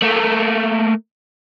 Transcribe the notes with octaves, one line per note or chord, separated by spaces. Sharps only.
A3 A#3